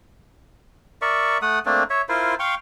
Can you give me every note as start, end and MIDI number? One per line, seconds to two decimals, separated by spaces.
1.02 1.38 70
1.02 1.38 74
1.02 1.38 76
1.02 1.38 85
1.42 1.59 57
1.42 1.59 78
1.42 1.59 87
1.66 1.83 57
1.66 1.83 58
1.66 1.83 60
1.66 1.83 62
1.90 2.02 73
1.90 2.02 76
2.09 2.35 64
2.09 2.35 65
2.09 2.35 70
2.09 2.35 72
2.39 2.55 77
2.39 2.55 79
2.39 2.55 84
2.39 2.55 85